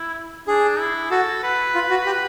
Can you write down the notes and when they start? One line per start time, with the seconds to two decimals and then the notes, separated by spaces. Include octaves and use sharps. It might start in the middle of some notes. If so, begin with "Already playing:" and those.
Already playing: E4
0.48 D4 G#4
0.79 E4
1.11 F#4 A4
1.43 B4
1.75 F4
1.90 F#4
2.06 G4